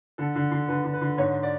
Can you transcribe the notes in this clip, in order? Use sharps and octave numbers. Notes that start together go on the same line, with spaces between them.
D3 A4
D3
D3
D3 B4
D3
B4
D3
G#2 C#5
D5